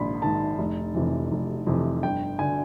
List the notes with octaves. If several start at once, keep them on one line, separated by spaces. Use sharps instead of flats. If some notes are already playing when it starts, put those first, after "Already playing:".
Already playing: A#1 G#2 D#3 B5 C6
G#2 D#3 A5
F1
F2 C3 E3
F1
F2 C3 E3
G1 G5
D3 G#5